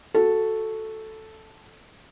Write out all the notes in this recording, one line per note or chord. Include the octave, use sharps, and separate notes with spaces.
F#4 A4